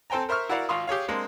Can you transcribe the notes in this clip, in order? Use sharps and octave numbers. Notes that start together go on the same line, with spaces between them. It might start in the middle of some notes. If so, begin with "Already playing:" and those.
C4 A4 C5 G5 G#5 A#5
A#4 C5 E5 C#6 F6
E4 F#4 A#4 D5 F5 F#5
G#1 F4 F5 C6 C#6 D#6
G4 G#4 C#5 F5
G#3 A#3 C4 D4